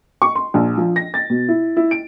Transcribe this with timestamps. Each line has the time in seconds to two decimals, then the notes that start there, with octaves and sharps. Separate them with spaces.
0.22 C#6
0.35 C6
0.54 A#1
0.78 F3
0.96 A#6
1.14 A6
1.30 B2
1.48 E4
1.77 E4
1.91 D7